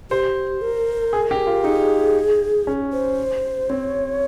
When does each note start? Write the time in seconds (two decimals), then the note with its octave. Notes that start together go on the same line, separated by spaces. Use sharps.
0.10 G4 C5
0.61 A#4
1.13 G#4
1.31 G4
1.47 F4
1.64 D#4 G#4
2.67 C#4
2.93 C5
3.70 C4 C#5